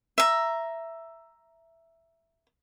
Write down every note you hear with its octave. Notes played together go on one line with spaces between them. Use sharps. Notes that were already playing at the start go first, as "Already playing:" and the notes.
E5 A#5